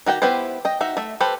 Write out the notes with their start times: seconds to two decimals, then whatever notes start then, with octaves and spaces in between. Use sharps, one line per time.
0.06 D#3 F#4 G4 G5
0.22 B3 E4 G4 B4 C5
0.65 D#5 G5
0.81 D#4 F#4 E5
0.97 A3 E5
1.21 G4 A4 B4 C5